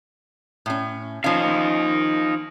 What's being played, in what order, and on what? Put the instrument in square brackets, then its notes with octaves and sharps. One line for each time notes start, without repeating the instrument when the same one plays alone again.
[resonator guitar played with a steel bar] A2 C#4
[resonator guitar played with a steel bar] F3 C#4 [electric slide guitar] D#4 F5